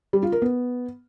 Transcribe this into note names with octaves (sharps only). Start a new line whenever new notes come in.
G3
F4
A#4
B3